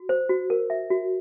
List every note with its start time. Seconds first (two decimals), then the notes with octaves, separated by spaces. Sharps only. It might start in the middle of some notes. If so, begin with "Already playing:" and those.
Already playing: F#4
0.09 C5
0.29 F#4
0.50 A#4
0.70 E5
0.90 F#4